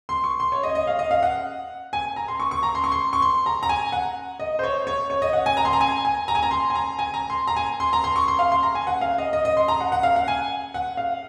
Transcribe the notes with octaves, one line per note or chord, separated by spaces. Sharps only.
C6
C#6
C6
C#5
D#5
D#5
F5
D#5
F5
F#5
G#5
A#5
C6
C#6
C#6
A#5
C6
C#6
C6
C#6
C6
A#5
A#5
G#5
F#5
D#5
C5
C#5
C#5
C#5
D#5
F#5
G#5
A#5
C6
A#5
G#5
G#5
A#5
G#5
A#5
C6
G#5
A#5
G#5
A#5
C6
A#5
G#5
C6
A#5
C6
C#6
C6
F5
C6
A#5
G#5
F#5
F5
D#5
D#5
D#5
C6
A#5
F#5
F#5
F5
F#5
G#5
F#5
F5